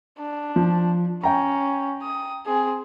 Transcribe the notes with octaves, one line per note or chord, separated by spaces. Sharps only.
D4
F3
C#4 G5 A#5
D#6
C4 G#4